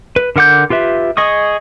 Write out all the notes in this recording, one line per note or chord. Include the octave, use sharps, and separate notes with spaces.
B4
D3 A#4 F#5 D6 G6
F4 G4 B4 E5
G#4 D#5 C#6 D#6